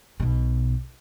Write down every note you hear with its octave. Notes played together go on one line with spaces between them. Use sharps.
B1 B2